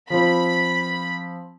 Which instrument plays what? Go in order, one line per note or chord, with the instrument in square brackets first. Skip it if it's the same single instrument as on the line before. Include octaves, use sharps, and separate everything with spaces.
[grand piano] F3 C4 [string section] B5